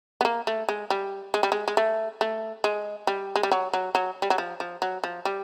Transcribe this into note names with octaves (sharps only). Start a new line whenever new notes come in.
B3
A#3
A3
G#3
G3
G#3
G3
G#3
G#3
A3
A3
G#3
G3
G#3
G3
F#3
F#3
F#3
G3
F#3
F3
F3
F#3
F3
G3